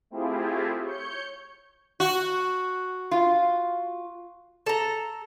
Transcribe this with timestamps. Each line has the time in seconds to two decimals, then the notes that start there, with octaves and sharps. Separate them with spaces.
0.10 A3 C4 E4 F4 G4 G#4
0.85 C#5 G6 C#7
2.00 F#4
3.11 F4
4.66 A4 A#5